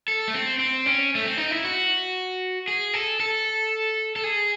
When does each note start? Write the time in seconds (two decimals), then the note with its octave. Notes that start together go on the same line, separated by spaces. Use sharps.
0.08 A4
0.28 A3
0.34 C4
0.59 C4
0.86 C#4
1.15 A3
1.25 C4
1.37 D#4
1.51 E4
1.64 F#4
2.68 G#4
2.94 A4
3.20 A4
4.16 A4
4.24 G#4